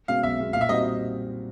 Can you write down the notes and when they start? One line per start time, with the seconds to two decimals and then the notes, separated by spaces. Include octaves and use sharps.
0.08 B2 G#3 C#4 F5
0.23 B1 E5
0.39 B2 G#3 C#4
0.53 A#2 F5
0.61 E5
0.69 G3 C4 D#4 F#4 D#5